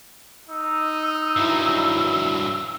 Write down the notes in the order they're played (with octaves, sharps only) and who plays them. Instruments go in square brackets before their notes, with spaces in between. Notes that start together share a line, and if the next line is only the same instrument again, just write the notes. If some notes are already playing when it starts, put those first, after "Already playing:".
[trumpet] D#4 [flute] E6
[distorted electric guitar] G2 F#3 [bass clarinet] E4